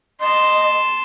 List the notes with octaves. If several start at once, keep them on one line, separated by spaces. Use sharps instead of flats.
D#5 A5 C6